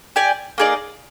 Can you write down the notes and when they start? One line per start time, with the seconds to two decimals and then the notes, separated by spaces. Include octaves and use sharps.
0.16 G4 D5 G#5
0.58 A#3 D#4 G#4 D5